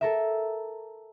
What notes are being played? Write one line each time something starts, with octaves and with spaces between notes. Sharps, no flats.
A4 A#4 E5